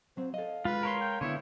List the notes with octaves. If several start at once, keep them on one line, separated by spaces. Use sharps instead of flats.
F#3 C4 C5
A4 D#5 F5
G#3 F4 B4
A#4 C#5 C6
G5
D3 B3 E4 C#5